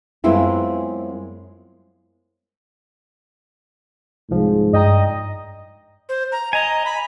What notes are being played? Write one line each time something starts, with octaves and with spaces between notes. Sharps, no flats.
F#2 G#3 B3 C4 E4 F4
C2 G#2 F3
G2 D5 D#5 G5 A#5
C5
A#5
D#5 G#5 A#5
B5